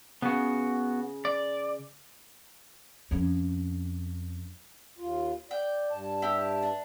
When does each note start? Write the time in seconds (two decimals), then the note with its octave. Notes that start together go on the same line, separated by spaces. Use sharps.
0.22 C#3 B3 F#4
1.25 D5
3.11 F2 C#4
4.98 D#2 F4
5.51 D5 G5
5.91 G2 A5
6.22 E4 G4
6.63 D4